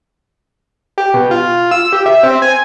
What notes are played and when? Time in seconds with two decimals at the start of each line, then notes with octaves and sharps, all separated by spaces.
0.98 G4
1.14 B2
1.31 F4
1.57 F4
1.71 E6
1.93 G4
2.06 E5
2.23 C4
2.42 G#5